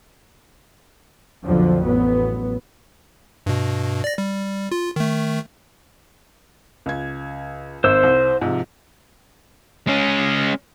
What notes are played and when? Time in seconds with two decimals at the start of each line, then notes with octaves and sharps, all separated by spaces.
1.43 B1 F2 D3 F3
1.84 A1 F#3 B3
3.46 G2 B2
4.04 D5 A#6
4.18 G3
4.72 F4
4.96 D#3 A3
6.86 C#2 G#6
7.84 G#1 C5 E6
8.03 C2
8.42 G#2 C3 F3
9.87 G#3 C#4